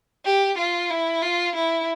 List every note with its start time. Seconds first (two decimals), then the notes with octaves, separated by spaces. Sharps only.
0.25 G4
0.58 F4
0.90 E4
1.22 F4
1.55 E4